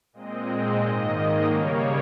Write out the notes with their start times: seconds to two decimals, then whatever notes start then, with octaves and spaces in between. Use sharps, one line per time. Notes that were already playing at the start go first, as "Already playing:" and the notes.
0.13 A#2 G#3 C4 D#5
0.47 D#5
0.81 G#2 D#3 A#3 D#5
1.47 C#3 G3 A#3 C#5